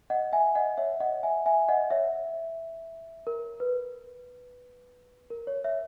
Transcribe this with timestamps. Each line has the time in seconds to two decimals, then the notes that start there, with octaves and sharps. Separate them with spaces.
0.10 D#5 F#5
0.32 E5 G#5
0.55 D#5 F#5
0.78 C#5 E5
1.00 D#5 F#5
1.23 E5 G#5
1.46 E5 G#5
1.68 D#5 F#5
1.90 C#5 E5
3.27 A#4
3.60 B4
5.30 A#4
5.47 C#5
5.64 C#5 E5